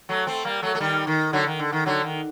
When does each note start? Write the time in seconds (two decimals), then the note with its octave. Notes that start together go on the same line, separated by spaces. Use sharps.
0.09 F#3 A3
0.27 A3 C4
0.45 G3 A#3
0.62 F#3 A3
0.75 A3
0.80 D#3 G3
1.07 D#3
1.33 D3 F#3
1.47 D#3
1.59 D3
1.72 D#3
1.86 D3 F#3
2.04 D#3